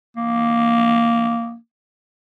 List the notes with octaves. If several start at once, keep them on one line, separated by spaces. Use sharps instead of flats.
A#3